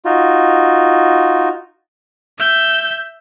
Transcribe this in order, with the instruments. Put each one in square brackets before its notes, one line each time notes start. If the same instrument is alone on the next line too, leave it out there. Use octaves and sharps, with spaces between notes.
[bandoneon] D#4 F4 F#4
[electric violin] E5 G6